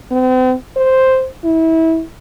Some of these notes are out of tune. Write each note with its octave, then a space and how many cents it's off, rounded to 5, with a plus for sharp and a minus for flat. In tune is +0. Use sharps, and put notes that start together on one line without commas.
C4 -40
C5 +0
E4 -25